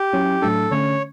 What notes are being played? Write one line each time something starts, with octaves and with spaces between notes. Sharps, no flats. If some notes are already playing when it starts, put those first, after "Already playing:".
Already playing: G4
F#3 C#4 E4
A2 F#3 A3 D4 A4
D3 A3 C#4 C#5